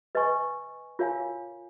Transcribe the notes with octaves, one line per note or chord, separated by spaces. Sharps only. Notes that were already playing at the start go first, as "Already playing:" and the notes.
B4 D#5 G#5 C#6
F4 A#4 C#5 F5 G#5